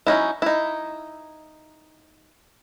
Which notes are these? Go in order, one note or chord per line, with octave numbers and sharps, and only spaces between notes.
F#3 C#4 D#4 E4
D#4 E4